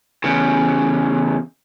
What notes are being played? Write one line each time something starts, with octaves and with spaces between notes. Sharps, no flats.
E2 C#3